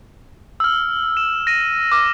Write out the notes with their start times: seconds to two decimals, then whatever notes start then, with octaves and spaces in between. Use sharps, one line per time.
0.60 E6 F6
1.17 E7
1.47 A#6 D#7
1.92 D6 F6